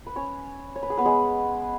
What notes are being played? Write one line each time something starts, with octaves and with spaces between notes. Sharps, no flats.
B4
C#4 C#5
C#5
B4
G#4
B3 B4
G#3 G#4